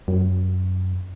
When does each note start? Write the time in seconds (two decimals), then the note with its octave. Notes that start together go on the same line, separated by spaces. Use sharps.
0.08 F#2